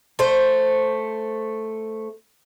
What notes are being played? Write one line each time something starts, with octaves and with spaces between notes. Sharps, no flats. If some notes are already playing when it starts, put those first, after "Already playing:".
A3 C5